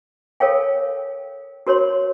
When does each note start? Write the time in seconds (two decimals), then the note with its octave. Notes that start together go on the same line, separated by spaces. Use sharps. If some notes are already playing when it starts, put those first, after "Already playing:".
0.40 A4 A#4 C#5 F5 G5
1.67 F#4 A#4 C#5 C6